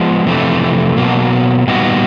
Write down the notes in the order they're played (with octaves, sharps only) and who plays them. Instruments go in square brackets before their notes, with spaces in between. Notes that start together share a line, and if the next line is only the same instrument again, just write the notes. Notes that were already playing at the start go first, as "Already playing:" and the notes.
Already playing: [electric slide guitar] F3 G#3 B3
F2 C3 E3 A3
B2 F#3 A#3
A#2 G3 B3 D#4 F#4